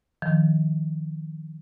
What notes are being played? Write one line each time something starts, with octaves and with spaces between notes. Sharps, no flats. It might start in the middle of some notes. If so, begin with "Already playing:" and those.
D#3 F3